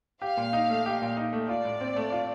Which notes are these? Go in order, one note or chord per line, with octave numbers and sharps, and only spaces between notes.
G4 F5
A#2
D#4
A3
G4
A#2
D#4
A3
F4 D5
A2
C4
A3
F4